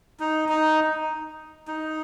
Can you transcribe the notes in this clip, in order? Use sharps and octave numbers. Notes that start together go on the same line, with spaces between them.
D#4
D#4
D#4